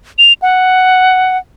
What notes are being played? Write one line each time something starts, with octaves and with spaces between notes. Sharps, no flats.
F7
F#5